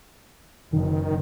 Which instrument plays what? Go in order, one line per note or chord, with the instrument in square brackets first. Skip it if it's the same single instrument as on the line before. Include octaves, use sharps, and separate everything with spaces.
[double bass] F#1 [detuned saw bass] D#3